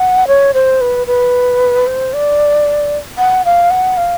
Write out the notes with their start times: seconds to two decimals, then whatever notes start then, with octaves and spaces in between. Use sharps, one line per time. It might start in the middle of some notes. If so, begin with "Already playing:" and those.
Already playing: F#5
0.27 C#5
0.54 C5
0.81 B4
1.07 B4
1.87 C5
2.13 D5
3.18 F#5
3.45 F5
3.71 F#5
3.97 F5